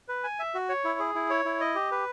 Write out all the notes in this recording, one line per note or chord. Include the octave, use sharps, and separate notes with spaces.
B4
G#5
E5
F#4
C#5
E4
G#4
E4
C#5
E4
D#5
G4
B4